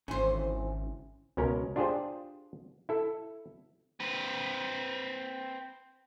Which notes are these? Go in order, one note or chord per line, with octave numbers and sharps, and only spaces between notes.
G#1 C#3 E3 C5
C#2 B2 C#4 A#4 C#5
D4 F4 G4 G#4 C5
E4 A4
C4 B4